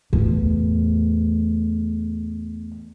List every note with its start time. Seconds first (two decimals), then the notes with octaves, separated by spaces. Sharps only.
0.13 E2 A2